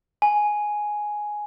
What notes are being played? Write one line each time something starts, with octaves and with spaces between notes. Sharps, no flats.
G#5